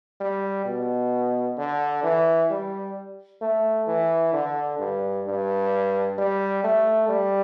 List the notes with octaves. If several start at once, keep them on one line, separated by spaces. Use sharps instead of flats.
G3
B2
D3
E3
G3
A3
E3
D3
G2
G2
G3
A3
G3